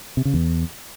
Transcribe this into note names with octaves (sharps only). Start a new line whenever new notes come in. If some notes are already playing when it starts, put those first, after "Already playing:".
C3
C#3
E2